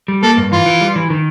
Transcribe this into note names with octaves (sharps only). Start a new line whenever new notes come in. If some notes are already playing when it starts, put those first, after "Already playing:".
G3
A#3 A4
G2
E3 F4
E3
G3
E3
D#3